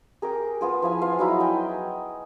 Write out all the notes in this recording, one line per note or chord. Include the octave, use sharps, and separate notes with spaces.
G#4 A#4 G5 D6
B3 F4 G#4
F3 E4 F5 G#5
B3 F4 F5
F#3 D#4 E4
D#4 G5 G#5